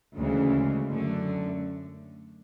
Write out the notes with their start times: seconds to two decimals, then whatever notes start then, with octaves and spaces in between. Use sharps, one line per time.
0.16 D2 C#3 E3 G#3
0.88 F#2 D3 A3